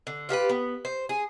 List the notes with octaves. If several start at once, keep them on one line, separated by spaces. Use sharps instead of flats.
D3
F4 G4 A#4 B4
B3
C5
G#4